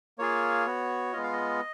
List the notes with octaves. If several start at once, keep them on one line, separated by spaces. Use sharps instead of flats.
A#3 F4 G#4 C#5
B3 F#4
G#3 B3 F4 D#5
F5
D#5